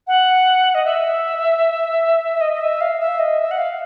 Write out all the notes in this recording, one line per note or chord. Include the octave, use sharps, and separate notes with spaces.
F#5
D#5
E5
D#5
D#5
E5
F5
E5
D#5
E5
F#5
F5